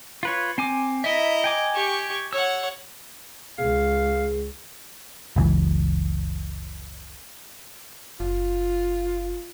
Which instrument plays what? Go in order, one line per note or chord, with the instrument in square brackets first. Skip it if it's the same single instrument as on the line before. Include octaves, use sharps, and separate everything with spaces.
[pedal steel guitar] F4 B4 C#5
C4 G#5 D6
[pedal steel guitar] E4 E5 [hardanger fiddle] D#5 A#5
[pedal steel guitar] G5 G#5 D6
[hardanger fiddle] G4 C#6
[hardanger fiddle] C#5 F#5 [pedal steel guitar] E6
[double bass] C#2 [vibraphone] G#4 [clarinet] F5
[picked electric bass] F#1 C#2 E3
[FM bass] F#1 [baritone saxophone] F4